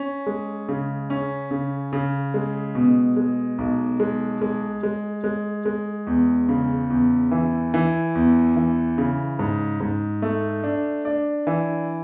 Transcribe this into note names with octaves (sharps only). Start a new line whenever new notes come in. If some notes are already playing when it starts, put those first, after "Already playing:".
Already playing: C#4
G#3
C#3
C#4
C#3
C#3
G#3
B2
G#3
B1
G#3
G#3
G#3
G#3
G#3
E2
C#3
E2
E3
E3
E2
E3
C#3
G#2
G#2
A3
D4
D4
E3